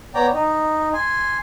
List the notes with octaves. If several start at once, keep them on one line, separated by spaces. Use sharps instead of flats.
B3 C#5 D5 G5 A#5
D#4
G#5 C6